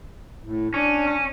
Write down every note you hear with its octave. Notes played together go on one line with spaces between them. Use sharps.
A2
C#4 D4
C#4